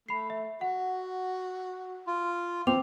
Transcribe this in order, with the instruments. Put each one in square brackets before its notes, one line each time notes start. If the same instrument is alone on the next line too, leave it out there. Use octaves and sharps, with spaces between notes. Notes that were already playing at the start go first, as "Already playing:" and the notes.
[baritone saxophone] A3 [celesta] B5 C7
[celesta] E5
[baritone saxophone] F#4 [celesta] F#5
[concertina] F4
[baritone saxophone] F3 [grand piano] C4 [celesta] G5 D6 F7